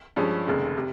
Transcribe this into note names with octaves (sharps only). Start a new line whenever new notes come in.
G2 F3 G#3 C#4
F1 D#2 C#3 G#3
C3